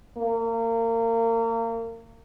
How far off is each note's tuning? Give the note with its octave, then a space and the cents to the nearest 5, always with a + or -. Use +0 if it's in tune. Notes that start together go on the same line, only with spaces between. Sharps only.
A#3 -30